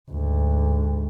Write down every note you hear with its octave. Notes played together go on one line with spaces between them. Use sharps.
D2 G#2